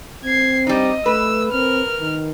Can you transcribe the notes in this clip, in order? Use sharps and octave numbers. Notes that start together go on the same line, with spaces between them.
C4 G#6 C7
G3 D#4 D#5
A3 B4 E6
C4 A#4 F6
D#3